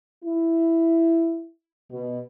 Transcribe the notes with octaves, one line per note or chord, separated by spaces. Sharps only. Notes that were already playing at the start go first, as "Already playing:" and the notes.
E4
B2